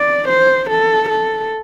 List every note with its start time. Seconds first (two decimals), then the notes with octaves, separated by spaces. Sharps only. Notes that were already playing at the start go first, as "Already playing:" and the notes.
Already playing: D5
0.29 C5
0.70 A4
1.10 A4